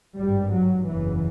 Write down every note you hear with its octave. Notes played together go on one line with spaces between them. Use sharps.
G#1 G2 G3
F#3
F#1 E2 C#3 E3